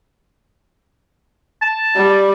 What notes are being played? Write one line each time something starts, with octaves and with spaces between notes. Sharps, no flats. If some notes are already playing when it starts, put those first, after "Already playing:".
A5
G3